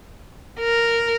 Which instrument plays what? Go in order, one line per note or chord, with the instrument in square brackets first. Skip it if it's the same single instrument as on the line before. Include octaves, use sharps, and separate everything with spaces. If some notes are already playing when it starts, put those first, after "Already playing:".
[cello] A#4